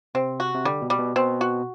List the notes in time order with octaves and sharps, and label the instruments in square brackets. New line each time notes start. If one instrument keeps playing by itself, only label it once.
[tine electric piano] C3 [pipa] C4
[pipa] F#4
[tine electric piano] C3
[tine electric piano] D3 [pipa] G3
[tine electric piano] B2
[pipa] G3
[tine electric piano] B2
[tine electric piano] B2 [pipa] C4
[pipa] F#4